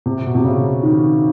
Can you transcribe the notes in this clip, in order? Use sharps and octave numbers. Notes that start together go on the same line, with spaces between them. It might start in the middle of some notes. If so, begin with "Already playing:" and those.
C3
B2
C3
C#3
D#3